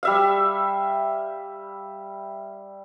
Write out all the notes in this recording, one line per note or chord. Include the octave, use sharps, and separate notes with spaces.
G3 E5 F5